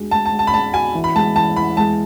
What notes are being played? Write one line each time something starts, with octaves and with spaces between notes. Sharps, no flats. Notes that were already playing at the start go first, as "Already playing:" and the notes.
Already playing: G#3 D4 F#4
G#3 A5
A5
G#3
A5
B5
G#3 A5
F#4 G#5
E3
B5
G#3 A5
E3 A5
E3 B5
G#3 A5